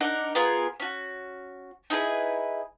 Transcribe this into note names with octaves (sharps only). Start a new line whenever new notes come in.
D4 D#4 A#4 F#5
B3 F4 G#4 A#4
C#4 F#4
D#4 E4 G#4 B4